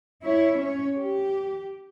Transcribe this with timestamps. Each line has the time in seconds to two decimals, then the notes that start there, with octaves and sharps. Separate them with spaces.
0.23 E4 C#5 E5
0.59 C#4 C#5
0.95 G4